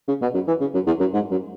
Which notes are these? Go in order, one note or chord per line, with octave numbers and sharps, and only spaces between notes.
C#3
B2
F#2
E3
C#3
F#2
E2
F#2
G#2
F#2